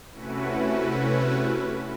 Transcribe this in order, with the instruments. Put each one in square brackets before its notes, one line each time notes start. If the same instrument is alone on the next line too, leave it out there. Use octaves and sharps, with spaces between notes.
[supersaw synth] C3 A3 C#4 E4 F#4 B4